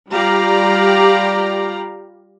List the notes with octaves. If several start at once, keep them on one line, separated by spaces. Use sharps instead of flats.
G3 F4 G4 D5 F5 A#5